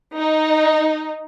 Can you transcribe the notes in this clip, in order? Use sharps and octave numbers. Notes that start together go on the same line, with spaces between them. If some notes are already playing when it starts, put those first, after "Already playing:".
D#4